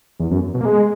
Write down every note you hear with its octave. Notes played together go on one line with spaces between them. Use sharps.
E2
F#2
B2
A#3
G#3